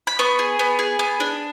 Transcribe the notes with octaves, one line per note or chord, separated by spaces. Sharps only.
B5
B3 C#6
G#4
B3
G#4
B3
D4